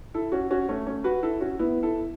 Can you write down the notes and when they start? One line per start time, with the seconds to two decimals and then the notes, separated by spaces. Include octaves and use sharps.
0.14 E4 A4
0.32 C#4 F#4
0.51 C#4 F#4
0.69 A3 C#4
0.86 A3 C#4
1.04 F#4 B4
1.23 E4 A4
1.41 C#4 F#4
1.59 B3 E4
1.83 E4 A4